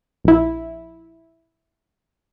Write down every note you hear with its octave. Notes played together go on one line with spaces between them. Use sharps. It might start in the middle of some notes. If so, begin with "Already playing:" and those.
A#1 E4